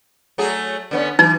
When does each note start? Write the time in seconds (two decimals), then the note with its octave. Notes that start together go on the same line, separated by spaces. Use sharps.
0.38 F#3 A3 G#4
0.91 D3 B3 C#4
1.19 E3 D#4